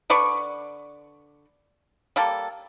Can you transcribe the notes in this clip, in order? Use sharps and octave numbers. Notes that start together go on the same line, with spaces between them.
D3 B4 D5 C#6
G3 A#3 A4